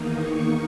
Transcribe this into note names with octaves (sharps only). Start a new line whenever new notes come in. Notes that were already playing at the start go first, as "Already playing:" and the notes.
Already playing: E2 D#3 A#3 D#4
C#6